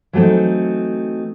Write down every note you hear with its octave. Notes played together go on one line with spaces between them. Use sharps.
E3 F#3 A3 C4 D#4